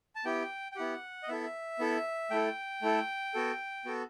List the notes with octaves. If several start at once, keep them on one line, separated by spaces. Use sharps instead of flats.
A5
B3 E4 G4 G5
G5
B3 E4 G4 F#5
D#5
B3 E4 A4 E5
B3 E4 A4
A3 E4 A4 G5
A3 E4 A4
B3 F#4 A4
B3 F#4 A4